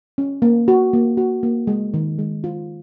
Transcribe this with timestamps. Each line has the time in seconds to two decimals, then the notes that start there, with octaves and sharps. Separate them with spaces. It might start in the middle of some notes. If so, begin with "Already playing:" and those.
0.18 C#4
0.42 A#3
0.68 F#4
0.93 A#3
1.17 F#4
1.43 A#3
1.67 G#3
1.94 D#3
2.19 G#3
2.44 F4